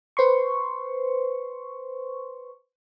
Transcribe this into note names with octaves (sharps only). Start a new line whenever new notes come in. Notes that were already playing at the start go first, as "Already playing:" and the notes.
B4 C5 C6 C#6